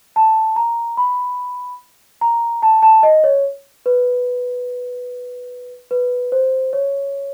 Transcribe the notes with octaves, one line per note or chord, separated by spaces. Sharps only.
A5
A#5
B5
A#5
A5
A5
D#5
C#5
B4
B4
C5
C#5